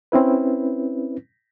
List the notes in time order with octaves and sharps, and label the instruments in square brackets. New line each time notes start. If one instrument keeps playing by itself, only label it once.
[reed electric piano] C4 C#4 E4 B4